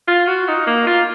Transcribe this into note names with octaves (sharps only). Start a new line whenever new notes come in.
F4
F#4
D#4
A#3
F4